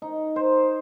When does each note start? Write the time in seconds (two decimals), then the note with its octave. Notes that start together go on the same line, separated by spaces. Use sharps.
0.02 D#4
0.36 C5